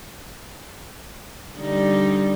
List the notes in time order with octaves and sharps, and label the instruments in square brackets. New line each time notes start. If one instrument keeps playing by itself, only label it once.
[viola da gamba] D3 G3 D#4